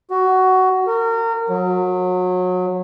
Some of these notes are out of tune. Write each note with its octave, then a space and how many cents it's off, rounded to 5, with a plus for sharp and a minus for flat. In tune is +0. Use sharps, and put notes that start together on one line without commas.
F#4 +15
A#4 -30
F#3 -25